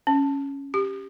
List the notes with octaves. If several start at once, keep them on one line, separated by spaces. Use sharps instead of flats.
C#4
G4